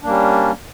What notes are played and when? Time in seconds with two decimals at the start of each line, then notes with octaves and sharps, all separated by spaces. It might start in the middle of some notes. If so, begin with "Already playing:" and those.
0.02 D4
0.04 A#3
0.07 G3
0.10 C#4